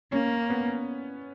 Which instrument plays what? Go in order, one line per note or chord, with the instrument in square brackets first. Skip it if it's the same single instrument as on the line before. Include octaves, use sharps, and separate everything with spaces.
[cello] A#3 [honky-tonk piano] C#4
[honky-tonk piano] B3